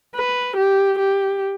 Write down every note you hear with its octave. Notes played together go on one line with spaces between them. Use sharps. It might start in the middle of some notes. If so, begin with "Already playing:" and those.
B4
G4
G4